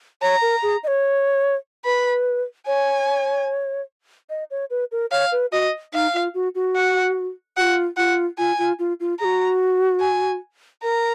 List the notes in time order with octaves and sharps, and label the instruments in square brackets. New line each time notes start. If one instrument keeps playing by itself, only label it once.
[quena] C#5 [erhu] A#5
[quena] A#4
G#4
D#5
C#5
[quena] B4 [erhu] B5
[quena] C#5 [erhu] G#5
[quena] D#5
C#5
B4
A#4
[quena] C#5 [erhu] F5
[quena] B4
[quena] F#4 [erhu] D#5
[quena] D#4 [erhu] F5
[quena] F4
F#4
F#4
[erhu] F#5
[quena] F#4 [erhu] F#5
[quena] F4
[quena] F4 [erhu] F#5
[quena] F4 [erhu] G#5
[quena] F4
F4
F4
[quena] G#4 [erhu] A#5
[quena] F#4
[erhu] G#5
[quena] A#4 [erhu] A#5